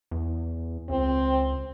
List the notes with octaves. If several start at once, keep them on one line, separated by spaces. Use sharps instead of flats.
E2
C#2 C4